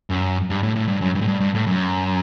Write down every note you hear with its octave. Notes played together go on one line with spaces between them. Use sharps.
F#2
G2
A2
A2
G2
F#2
G2
A2
G2
G2
A2
F#2